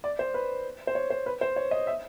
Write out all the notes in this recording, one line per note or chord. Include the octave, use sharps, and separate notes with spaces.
D5
C5
B4
C5
C#5
C5
B4
C5
C#5
D#5
E5